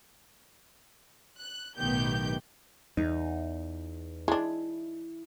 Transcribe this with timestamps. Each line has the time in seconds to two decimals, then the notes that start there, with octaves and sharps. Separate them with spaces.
1.38 F#6
1.78 B1 A2 D#3 B3 G4 G6
2.97 E2 D#4
4.28 G#3 D4 E4